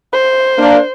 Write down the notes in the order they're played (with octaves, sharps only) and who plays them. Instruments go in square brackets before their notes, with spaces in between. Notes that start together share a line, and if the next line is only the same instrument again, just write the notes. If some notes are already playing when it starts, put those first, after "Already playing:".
[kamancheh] C5
[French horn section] A#3 D4